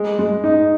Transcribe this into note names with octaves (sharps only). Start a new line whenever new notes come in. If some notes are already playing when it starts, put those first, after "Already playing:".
Already playing: G#3
G#3
D#4